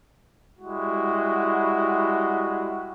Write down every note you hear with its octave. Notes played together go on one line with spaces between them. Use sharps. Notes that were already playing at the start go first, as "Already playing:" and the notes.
G3 G#3 E4 F#4